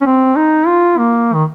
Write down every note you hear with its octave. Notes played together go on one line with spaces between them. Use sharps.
C#4
C4
D#4
F4
A#3
D#3